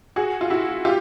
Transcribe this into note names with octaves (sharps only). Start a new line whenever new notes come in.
F#4 G#4
F4
E4 F#4
F4 G4